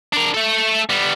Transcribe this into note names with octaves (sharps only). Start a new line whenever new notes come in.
D4 A#4
A3 A4
G3 B3